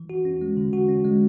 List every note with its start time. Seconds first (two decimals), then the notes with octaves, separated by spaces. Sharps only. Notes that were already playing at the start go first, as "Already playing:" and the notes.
Already playing: E3
0.10 F#4
0.25 C#4
0.41 G#3
0.57 D3
0.73 F#4
0.89 C#4
1.05 G#3